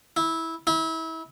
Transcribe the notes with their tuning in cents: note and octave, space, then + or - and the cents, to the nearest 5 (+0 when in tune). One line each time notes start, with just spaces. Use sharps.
E4 -15
E4 -30